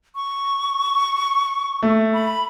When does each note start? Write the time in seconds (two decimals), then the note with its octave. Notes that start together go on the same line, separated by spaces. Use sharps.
0.15 C#6
1.83 A3
2.14 B5